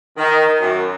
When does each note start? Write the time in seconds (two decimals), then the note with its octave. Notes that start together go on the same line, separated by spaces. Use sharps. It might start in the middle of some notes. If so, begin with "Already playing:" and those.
0.17 D#3
0.59 F#2